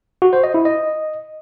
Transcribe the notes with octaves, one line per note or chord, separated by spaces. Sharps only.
F#4
C5
D#5
E4
D#5